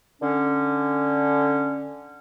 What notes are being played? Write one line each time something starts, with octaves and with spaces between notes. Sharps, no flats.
D3 C#4